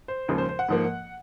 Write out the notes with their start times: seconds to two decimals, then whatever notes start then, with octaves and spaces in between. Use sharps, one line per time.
0.08 C5
0.28 D#2 C#3 F3 G#3
0.38 C5
0.49 C5
0.59 F#5
0.69 G#2 F3 A#3